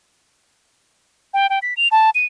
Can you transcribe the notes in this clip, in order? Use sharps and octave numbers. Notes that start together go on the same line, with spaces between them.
G5
G5
B6
F7
A5
D#7